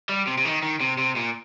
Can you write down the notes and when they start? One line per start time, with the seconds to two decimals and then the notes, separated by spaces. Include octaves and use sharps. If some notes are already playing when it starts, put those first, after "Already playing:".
0.09 G3
0.27 C3
0.38 C3
0.45 D#3
0.63 D#3
0.81 C3
0.98 C3
1.16 A#2